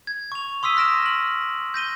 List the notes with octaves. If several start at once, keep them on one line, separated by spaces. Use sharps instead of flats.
G#6
C#6 F7
C6 D#6 E6 B6 D#7
C6 F6 A#6 D7 E7
F#7
G6 A#6 D#7 G7